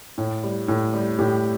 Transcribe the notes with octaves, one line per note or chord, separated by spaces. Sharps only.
A2
G3
A2
G3
A2 G4